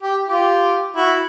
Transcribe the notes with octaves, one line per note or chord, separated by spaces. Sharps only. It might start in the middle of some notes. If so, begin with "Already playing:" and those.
G4
F4 G4
E4 F#4